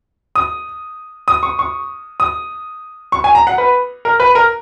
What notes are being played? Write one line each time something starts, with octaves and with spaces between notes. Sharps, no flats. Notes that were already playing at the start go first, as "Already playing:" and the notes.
D#6
D#6
C#6
C#6
D#6
C#6
G#5
A#5
F#5
B4
A#4
B4
A#4